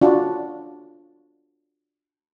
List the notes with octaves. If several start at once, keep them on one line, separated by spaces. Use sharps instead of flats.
D4 F4 F#4